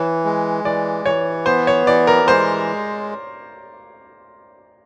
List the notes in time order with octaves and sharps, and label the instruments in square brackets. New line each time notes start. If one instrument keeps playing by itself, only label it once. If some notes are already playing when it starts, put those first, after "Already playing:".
Already playing: [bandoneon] E3 [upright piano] C#5
[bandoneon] G#3
[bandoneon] E3 [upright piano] D5
[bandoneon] E3 [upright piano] C#5
[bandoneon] B3 [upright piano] C5
[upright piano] C#5
[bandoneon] E3 [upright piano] D5
[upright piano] A#4
[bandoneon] G#3 [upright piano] C5